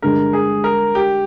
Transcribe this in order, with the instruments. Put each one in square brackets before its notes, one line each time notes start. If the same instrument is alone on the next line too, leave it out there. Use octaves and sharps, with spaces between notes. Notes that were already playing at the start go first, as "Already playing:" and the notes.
[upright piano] G2 D3 G#3 [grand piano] A#4
[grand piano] G#4
A#4
G4